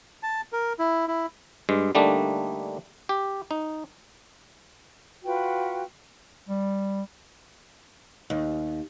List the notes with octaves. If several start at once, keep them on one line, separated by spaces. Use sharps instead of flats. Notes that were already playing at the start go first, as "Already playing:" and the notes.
A5
A#4
E4
E4
G2 G#3
D3 G3 A3 A#3 D4 D#4
G4
D#4
F4 F#4 B4 G5
G3
D#2